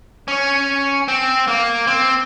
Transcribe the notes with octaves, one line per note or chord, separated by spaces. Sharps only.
C#4
C4
A#3
C4